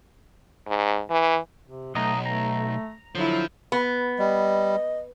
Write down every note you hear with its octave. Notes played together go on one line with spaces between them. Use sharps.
G#2
E3
C3
B1 A3 D#5 A#5
A3 A#5
D3 F3 F#3 E4
B3
G3 D#5